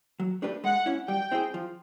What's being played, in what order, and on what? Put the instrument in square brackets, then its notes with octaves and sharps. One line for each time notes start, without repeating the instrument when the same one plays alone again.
[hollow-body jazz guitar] F#3
A3 D4 G4 B4
[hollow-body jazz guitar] G#3 [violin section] F#5
[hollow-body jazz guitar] C#4 E4
[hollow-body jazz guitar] G3 [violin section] G5
[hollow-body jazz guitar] C4 E4 G#4
F3